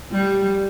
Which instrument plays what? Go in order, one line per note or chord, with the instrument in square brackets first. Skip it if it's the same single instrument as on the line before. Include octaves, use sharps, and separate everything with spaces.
[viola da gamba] G3